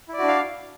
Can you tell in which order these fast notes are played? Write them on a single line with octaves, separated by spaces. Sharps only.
E4 D5 F#4 D4 F5